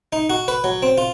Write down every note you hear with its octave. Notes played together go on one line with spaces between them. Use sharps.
D#4
F#4
B4
F#3
C4
F4